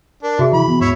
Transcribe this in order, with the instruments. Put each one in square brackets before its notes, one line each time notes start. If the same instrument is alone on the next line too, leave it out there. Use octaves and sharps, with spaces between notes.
[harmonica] D4 [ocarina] A#4
[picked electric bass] C3 [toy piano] F#4 G#4 [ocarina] E5
[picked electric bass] C3 D#3 E3 [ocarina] E4 [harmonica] B5
[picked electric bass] E3 [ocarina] B3
[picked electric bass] D#1 G#2 [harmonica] E4 C#5 E5